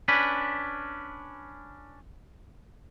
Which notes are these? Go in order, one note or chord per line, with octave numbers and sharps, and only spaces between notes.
C#4 D4 B4